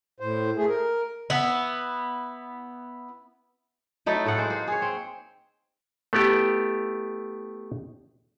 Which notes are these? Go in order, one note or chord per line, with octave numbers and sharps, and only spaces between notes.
A2 C5
A3 G#4
A#4
B3 E4
F#3 A3 D#4 E4
A2 A4 F5 F#5
G#3 C5
A#3
G#4 C#5
C4
A3 B3 E4 G4